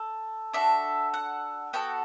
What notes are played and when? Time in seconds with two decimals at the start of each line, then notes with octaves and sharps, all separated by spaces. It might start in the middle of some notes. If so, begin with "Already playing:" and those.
Already playing: A4
0.53 D4 F#4 A4 E5
1.14 F#5
1.73 B3 F#4 A4 G5